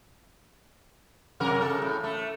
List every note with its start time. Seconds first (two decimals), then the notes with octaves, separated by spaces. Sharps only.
1.40 F#2 C3 A#4
1.61 C#3 A4
1.82 A2
2.04 A3